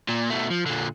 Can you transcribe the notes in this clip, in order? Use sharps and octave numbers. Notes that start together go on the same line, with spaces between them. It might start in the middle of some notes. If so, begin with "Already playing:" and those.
A#2
B2 A3
F3
A#2 D3